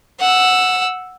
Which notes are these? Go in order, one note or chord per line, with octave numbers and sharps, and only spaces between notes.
F#5 E6